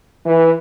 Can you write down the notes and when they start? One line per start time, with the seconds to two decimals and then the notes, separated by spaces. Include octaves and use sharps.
0.25 E3